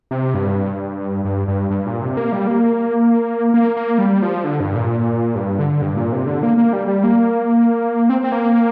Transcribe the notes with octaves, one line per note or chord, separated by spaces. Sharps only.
C3
G2
G2
G2
G2
A#2
C3
A#3
G3
A#3
A#3
A#3
G3
F3
D3
G2
A#2
G2
D3
G2
A#2
C3
D3
A#3
A#3
G3
G3
A#3
C4
C4
A#3